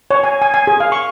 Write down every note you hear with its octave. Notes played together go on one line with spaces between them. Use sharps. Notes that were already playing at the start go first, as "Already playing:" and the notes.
C#5
G#5
G#5
G#5
G#4
F5
C#6